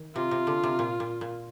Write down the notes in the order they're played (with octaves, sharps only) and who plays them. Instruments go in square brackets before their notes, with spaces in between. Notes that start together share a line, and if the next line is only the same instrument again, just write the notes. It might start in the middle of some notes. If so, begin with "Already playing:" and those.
Already playing: [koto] D#3
[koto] C3 [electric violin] F4
[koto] C3
D3
C3
A#2
A#2
A#2